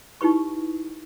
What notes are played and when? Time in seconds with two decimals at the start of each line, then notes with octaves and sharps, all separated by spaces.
0.21 D#4 E4 G4 B4 C#6